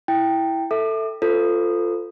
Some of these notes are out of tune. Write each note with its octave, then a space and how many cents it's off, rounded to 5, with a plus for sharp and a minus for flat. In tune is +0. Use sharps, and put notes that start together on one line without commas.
E4 +0 G5 +0
A4 +15 E5 -10 D6 +35
F4 +0 A4 +15 C5 -40